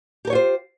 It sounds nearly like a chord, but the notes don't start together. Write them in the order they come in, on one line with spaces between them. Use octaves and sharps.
G4 A#4 C#5 F4 C5